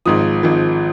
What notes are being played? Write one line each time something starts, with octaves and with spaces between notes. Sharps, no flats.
G#1 G#2 F3 D#6
G#1 G#2 F3